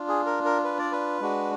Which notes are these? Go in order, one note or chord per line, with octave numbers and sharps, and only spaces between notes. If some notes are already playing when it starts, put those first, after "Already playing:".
Already playing: D4 F4
G#4
A#4
A#4
B4
D5
B4
G#3 D4 F#4